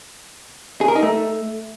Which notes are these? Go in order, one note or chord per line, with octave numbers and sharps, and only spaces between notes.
G#4
A#4
D#4
A3